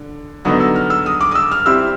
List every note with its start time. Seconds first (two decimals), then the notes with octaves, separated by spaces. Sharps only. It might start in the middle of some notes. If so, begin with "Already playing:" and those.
Already playing: D3
0.45 D3 F#3 B3 D#4 D#6
0.60 E6
0.76 F6
0.90 E6
1.06 D#6
1.21 D6
1.31 D#6
1.35 E6
1.51 F6
1.66 G3 C4 E4 G4 E6